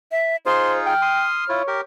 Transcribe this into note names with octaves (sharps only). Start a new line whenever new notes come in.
E5
D#4 F4 G#4 C5 C6
G5 F6
C6 D#6
E4 F4 C#5
G4 A#4